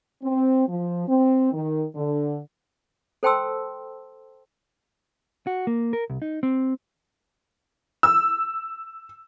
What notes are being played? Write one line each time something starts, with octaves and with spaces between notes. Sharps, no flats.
C4
F3
C4
D#3
D3
A4 C5 G5 A5 C6 E6
F#4
A#3
A#4
C2
D#4
C4
E6